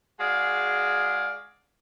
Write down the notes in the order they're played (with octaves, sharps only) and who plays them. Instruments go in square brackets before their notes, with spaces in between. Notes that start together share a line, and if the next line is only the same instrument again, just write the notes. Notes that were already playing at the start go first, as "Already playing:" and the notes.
[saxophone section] G#3 F#4 G#4 D5 F5